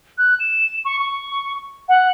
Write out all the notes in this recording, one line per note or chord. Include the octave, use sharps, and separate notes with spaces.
F#6
E7
C#6
C#6
F#5